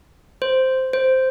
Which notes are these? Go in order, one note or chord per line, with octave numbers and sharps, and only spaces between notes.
C5
C5